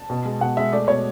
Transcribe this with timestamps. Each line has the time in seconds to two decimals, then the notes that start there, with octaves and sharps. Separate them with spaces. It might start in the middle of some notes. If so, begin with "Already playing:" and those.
Already playing: A5
0.10 B2
0.25 G#3
0.41 B2 F#5
0.57 G#3 E5
0.73 A3 D5
0.88 B2 C#5